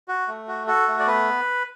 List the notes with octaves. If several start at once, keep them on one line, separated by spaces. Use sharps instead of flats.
F#4
A3
F#4
F#4 A4
A3
D5
B3 B4